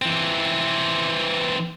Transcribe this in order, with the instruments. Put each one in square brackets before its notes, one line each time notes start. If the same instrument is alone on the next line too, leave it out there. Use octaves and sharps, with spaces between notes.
[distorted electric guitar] E3 C4